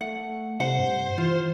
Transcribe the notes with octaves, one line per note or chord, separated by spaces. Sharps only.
A3 F#5
C3 C5 F#5
G2
E3 F4